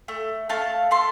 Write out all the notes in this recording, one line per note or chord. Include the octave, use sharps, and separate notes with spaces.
A3
A3 F5 A5
A3 A5 C6